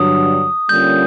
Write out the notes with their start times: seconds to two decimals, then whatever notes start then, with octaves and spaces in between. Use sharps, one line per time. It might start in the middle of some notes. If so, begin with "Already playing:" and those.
Already playing: G2 D3 F#3 D#6
0.69 D3 G3 A#3 C#4 F4 G6